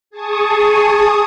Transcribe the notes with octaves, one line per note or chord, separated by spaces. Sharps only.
G#4 A5 C#6 D#6